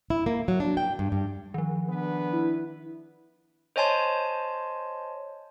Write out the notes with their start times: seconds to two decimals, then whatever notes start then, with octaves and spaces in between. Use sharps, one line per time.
0.10 E4
0.26 A#3
0.48 F#3
0.60 D4
0.77 G5
0.99 G2
1.12 G2
1.54 D#3 F3
1.89 B3 D4 B4
2.33 E4
3.76 C5 C#5 D#5 G#5 A5 C6